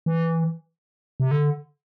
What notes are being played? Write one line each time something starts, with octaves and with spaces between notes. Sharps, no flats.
E3
C3
D3